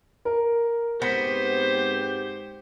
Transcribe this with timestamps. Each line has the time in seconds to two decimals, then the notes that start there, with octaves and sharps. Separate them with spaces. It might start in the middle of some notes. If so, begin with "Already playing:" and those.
0.25 A#4
1.02 G#2 B3 C4 G4 C5 A#6 B6 C#7